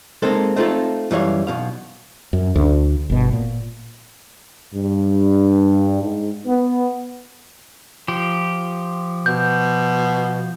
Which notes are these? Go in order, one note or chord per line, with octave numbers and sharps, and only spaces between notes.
G#3 A#3 C4 D#4 A4
A3 C4 D#4 F4 A4
F#2 E3 G3 C#5 F5
B1 B2 F5
F#2
D2
G1 B2
A#2
G2
G#2
B3
F3 G4
B2 G6